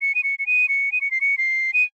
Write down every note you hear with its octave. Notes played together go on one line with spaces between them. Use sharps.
C#7
D#7
C#7
C#7
D#7
C#7
D#7
C#7
C7
C#7
C7
D#7